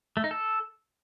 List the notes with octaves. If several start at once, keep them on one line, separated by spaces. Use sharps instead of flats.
A3
D#4
A4